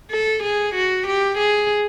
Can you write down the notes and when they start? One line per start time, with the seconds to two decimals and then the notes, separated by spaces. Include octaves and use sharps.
0.11 A4
0.43 G#4
0.75 F#4
1.07 G4
1.38 G#4